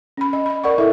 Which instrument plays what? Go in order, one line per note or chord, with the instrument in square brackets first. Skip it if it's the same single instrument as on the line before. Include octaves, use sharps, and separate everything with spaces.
[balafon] C#4 B5
D#5
D#5 B5
A#4 D5 F#5 C#6
E4 A4 A#4 E5